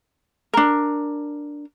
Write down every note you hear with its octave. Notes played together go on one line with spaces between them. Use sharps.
D4 A#4